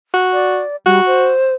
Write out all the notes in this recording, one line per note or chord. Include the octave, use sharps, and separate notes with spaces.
F#4
D5
G3 F#4
C5